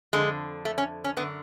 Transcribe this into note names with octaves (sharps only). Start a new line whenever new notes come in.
F2 D3 G#3
A3
C#4
C#4
F#2 D3 B3